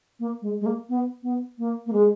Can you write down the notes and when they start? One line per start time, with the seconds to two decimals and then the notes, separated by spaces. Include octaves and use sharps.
0.20 A#3
0.42 G#3
0.61 G#3
0.66 A#3
0.89 B3
1.23 B3
1.58 A#3
1.86 A#3
1.93 G#3